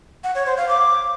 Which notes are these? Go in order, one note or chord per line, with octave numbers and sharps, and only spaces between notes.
F#5
C#5
C5
F5
D6